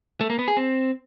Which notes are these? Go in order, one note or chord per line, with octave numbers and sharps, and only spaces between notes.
A3
A#3
B3
G#4
C4